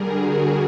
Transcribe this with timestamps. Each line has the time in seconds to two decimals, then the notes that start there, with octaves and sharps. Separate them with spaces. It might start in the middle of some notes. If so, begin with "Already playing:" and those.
Already playing: D3 G3 G#4 A#4
0.15 F#4